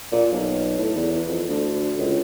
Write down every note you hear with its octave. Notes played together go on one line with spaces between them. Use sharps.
A#2
B1
A2
E2
F2
D2
C#2